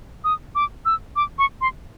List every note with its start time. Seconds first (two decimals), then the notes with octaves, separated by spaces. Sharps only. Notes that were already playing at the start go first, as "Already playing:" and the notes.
0.24 D#6
0.55 D6
0.85 E6
1.16 D6
1.38 C#6
1.61 C6